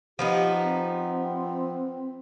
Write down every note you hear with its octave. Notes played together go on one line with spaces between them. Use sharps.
F3 B3 D#4 G4
C4